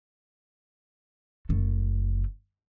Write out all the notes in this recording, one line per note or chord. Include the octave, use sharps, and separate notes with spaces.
F#1 A3